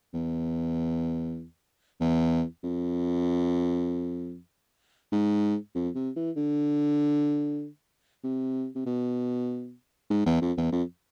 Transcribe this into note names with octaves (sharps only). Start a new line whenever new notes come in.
E2
E2
F2
G#2
F2
C3
E3
D3
C3
C3
B2
G#2
E2
F2
E2
F2